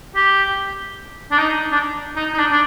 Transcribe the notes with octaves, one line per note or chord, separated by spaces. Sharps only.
G4
D4
D#4
D4
D#4
D#4
D4
D4